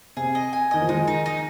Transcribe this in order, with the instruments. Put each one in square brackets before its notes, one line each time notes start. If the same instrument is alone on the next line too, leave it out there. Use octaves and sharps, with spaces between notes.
[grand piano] C3 [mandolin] G#4
[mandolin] D#5
G#5
[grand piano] D#3 [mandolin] D#5
[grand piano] F3
[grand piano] D#3 G#3 [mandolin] D#4
[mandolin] D#4
D#4